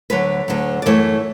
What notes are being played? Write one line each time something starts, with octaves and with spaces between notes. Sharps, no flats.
D2 D3 F#3 B4
D2 D3 F#3
D5
F#2 E3 A3 C#5